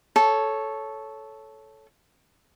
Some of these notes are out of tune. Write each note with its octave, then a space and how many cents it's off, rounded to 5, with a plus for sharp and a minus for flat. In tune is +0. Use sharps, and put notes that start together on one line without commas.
A4 -10 C#5 +0